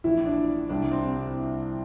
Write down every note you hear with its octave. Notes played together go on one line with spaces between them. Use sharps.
A#1 A2 E3 E4
D4
C2 C3 G3 D4
C4